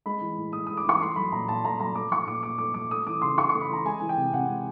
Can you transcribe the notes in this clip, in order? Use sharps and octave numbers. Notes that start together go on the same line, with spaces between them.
G#3 B5
E3
A2
A2 D#6
G#3 D#6
D6
E3 C#6
A3 C6
F#3 B5
A#2 A#5
A#2 A5
A3 A#5
F#3 A#5
A3 D6
F3 C#6
A#2 D6
A#2 D6
A3 D6
F3 D6
A3 D#6
E3 D6
C#3 C6
C#3 C#6
A3 C#6
B5
E3 A#5
G#3 G#5
E3
G5
C3
C3 F#5
G#3